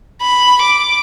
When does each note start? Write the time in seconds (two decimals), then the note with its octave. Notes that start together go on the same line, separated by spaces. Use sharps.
0.22 B5
0.62 D6